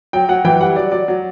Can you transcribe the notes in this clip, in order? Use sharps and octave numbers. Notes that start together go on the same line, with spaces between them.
F#3 G5
F#3 F#5
E3 G5
G3 F#5
F#3 D5
F#3 D5
F#3